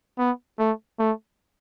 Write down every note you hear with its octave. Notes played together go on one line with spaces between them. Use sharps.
B3
A3
A3